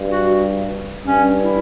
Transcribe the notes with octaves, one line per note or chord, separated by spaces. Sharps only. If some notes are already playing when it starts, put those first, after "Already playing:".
Already playing: G2
F#4
G2 C#4
E4